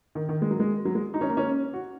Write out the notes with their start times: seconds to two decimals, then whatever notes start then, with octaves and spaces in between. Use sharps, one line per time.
0.15 D#3
0.29 D#3
0.42 G#3
0.51 F#3
0.60 G#3
0.85 F#3
0.95 G#3
1.14 D#4
1.21 C#4
1.29 A#3
1.37 C#4
1.73 F#4